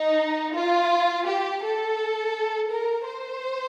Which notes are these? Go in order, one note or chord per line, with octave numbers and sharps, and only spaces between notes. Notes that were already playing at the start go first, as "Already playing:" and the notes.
Already playing: D#4
F4
G4
A4
A#4
C5